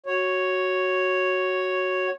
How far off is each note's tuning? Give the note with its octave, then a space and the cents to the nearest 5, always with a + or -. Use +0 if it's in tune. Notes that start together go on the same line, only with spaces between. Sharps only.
F#4 +5 C#5 +0